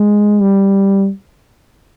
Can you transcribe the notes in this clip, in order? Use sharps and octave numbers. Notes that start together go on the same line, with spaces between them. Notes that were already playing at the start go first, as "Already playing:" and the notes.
Already playing: G#3
G3